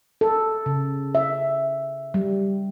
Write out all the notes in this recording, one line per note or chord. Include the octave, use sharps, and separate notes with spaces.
A4
C#3
E5
G3